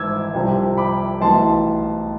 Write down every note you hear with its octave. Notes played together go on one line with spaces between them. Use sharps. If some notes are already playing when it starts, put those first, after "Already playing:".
Already playing: G#1 G#2 E3 D6 E6 G#6
C2 C3 F3
B5 D6
B1 A2 E3 A5 C6